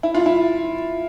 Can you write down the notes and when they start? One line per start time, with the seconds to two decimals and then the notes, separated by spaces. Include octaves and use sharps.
0.03 E4
0.15 F4
0.26 E4